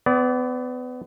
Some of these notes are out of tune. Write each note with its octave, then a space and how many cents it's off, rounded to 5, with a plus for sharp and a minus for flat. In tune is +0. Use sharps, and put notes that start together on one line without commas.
B3 +30 D5 -20